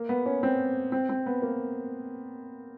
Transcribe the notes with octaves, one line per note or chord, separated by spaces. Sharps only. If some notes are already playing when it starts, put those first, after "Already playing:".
Already playing: A#3
B3
C#4
C4
C4
C4
B3
A#3